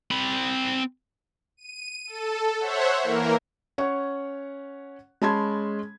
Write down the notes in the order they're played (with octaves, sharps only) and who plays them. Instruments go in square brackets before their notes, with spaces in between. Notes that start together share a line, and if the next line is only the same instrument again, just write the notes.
[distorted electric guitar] C4 B5
[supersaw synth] D#7
A4
C5 C#5 E5 F#5
E3 A#3 A#4
[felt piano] C#4 C#5 F#5 C#6
G#3 C#4 A5 B5 C6 G#6